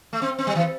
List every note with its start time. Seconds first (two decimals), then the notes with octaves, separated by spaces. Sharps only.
0.13 A3
0.22 C4
0.38 C4
0.47 G3
0.55 E3